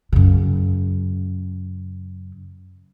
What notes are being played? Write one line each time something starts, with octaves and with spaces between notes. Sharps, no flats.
F#2 C#3